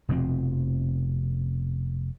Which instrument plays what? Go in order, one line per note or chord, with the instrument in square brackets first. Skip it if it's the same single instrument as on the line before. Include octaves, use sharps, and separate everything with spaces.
[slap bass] F1 B2 F3 C4